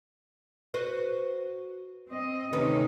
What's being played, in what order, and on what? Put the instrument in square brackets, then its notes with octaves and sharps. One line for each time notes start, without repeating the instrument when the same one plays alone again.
[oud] F#4 B4 C5
[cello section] C4 D#5
[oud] D2 D#3 B4 [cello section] C3 C#4 D#4